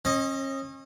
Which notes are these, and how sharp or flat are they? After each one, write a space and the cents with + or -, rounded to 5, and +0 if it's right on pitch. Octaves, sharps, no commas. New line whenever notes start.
C#4 -40 D#5 +0